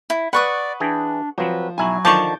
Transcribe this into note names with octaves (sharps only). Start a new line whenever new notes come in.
E4
B4 D5 F#5 B5 C#6 D#6
E3 D4 G#4 G5
F3 F#3 C4 B4
B1 F#3 E4 G#5 A#5
D3 D#3 F3 A5 C#6 D6 G6